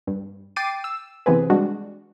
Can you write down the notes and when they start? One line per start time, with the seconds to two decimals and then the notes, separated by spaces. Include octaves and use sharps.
0.07 G2
0.56 G5 D6 A6 C7 D#7
0.84 E6
1.26 C3 E3 B3 C4 G#4 B4
1.50 G3 G#3 D4 F#4